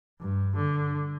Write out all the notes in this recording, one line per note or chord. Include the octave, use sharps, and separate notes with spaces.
G2
D3